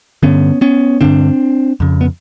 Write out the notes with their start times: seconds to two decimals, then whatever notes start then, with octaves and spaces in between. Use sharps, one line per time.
0.23 G2 D3 B3 C#4
0.61 B3 C#4
1.01 G2 D3 C4 D4
1.80 F2 C#3
2.01 B3